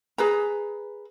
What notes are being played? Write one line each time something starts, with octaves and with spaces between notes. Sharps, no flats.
G#4 B4 A#5